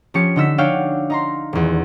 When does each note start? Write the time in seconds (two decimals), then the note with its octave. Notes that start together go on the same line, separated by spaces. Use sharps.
0.14 F3 C#4 G4 C#7
0.36 D3 D#4 E6 B6
0.58 D4 F#4 C#5 F5 G5 D6
1.10 D#4 A#5 C6
1.53 D#1 E2